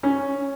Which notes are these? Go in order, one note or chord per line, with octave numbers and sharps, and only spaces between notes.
C#4